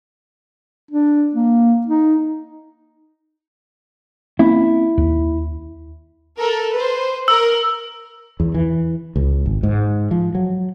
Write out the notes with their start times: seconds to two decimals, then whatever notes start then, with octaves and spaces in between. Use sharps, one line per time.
0.91 D4
1.35 A#3
1.87 D#4
4.39 A#3 C4 C#4 E4
4.97 D#2
6.38 A4 A#4
6.73 B4 C5
7.28 A#4 E6
8.40 E2
8.54 E3
9.16 C#2
9.46 G#1
9.63 G#2
10.11 F3
10.35 F#3